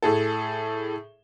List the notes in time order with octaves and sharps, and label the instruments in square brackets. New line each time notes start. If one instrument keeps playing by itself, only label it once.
[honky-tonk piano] A2 G#4 A4